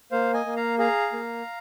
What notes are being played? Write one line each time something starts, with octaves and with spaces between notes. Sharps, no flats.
A#3 C5 F5
D#5 G#5
A#3
F5 A#5
G#4 F5 A#5
A#3